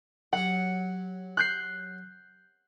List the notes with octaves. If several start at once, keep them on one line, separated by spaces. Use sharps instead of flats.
F#3 G4 F#5
F#6 G6 C7